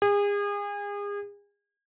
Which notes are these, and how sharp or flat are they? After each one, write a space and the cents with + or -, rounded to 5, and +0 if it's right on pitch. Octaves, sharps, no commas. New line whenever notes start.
G#4 -35